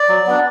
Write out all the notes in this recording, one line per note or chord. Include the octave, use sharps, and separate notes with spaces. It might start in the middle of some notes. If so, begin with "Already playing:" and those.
Already playing: D5
F#3
B3 D4